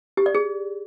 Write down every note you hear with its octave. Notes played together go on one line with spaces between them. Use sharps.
G4
D5
G#4